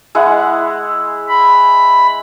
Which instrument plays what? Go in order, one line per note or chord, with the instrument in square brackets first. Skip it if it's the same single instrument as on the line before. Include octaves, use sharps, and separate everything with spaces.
[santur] G#3 E4 F#5
[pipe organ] B5